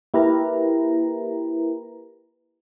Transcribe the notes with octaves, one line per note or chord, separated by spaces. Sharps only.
A#3 E4 G4 A#4 B4 A#5